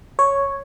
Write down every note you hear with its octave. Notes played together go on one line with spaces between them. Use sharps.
C#5